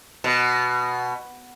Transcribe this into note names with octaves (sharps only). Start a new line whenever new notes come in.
B2